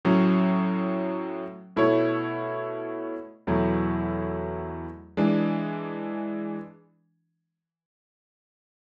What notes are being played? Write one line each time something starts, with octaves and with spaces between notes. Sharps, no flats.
A2 F#3 C#4
B2 A3 E4 A4 C#5
E2 B2 F#3 A3 E4
E3 G#3 D4